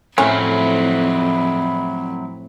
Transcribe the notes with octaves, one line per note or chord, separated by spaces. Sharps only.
F2 A2 F#3 C4 C#4 E4 F5